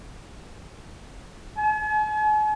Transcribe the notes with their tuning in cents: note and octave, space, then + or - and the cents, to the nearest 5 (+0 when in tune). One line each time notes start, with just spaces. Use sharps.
G#5 +45